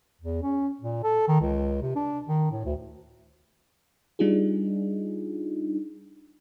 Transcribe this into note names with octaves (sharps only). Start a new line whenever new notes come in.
E2
C#4
A#2
A4
D#3
C#2
C3
D4
D#3
A2
D2
G3 D4 D#4 F4 G#4